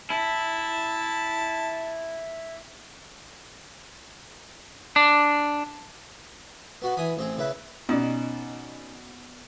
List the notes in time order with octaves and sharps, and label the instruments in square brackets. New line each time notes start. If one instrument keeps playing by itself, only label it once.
[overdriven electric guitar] E4 [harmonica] A5
[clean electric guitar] D4
[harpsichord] B3 F#4 F#5
E3 G#5 B5 D#6
A1 C4 G#4
C#3 E4 B4
[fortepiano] B2 D5 [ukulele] C#4 D#4